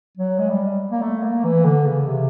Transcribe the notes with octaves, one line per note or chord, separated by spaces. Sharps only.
F#3
G#3
G3
A#3
A3
A#3
E3
D3
C#3
C3